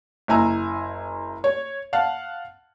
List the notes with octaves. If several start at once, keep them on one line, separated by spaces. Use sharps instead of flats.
F#1 E4 G#5 A#5 E6
C#5
F5 F#5 A5